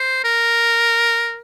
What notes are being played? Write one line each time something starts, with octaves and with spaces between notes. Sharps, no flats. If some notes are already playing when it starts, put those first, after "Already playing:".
Already playing: C5
A#4